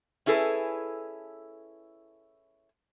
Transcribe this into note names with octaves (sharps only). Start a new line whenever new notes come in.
C#4 E4 G#4 A4 B4